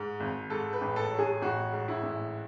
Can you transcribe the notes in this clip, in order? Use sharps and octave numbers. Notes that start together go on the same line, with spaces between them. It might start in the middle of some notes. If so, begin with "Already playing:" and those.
Already playing: G#2
G#1
G#2 A4
B4
A1
A4
F#3
G#4
A1 F#4
G#2
E4
A1